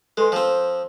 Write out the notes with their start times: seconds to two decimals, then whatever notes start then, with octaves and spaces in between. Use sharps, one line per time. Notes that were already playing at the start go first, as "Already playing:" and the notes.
0.17 G#3 A4 B4 C6
0.32 F3 C4